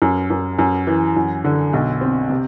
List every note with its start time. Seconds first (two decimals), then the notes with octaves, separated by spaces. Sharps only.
0.02 F#2
0.30 F#2
0.59 F#2
0.87 E3
1.17 F#2
1.44 D3
1.73 B1
2.01 C4
2.30 C3